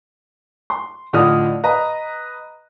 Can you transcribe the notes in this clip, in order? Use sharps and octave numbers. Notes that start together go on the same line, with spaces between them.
C6
A2 D3 F3 D#5 D#6 F6
B4 D#5 A#5